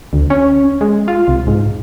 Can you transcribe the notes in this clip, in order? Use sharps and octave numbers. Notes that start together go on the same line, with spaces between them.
D2
C#4
G#3
F4
C2
G#2